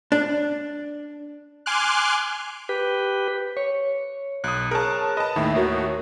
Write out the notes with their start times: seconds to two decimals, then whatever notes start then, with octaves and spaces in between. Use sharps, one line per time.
0.12 D4
1.66 G#5 C6 D6 F6 F#6
2.69 G4 B4
3.57 C#5
4.44 B1 D#6 F#6
4.71 G#4 A#4 C#5 A5 F#6
5.17 B4 D#5 A5
5.36 D#2 A2 D#3 E5
5.56 F#4 A#4 C#5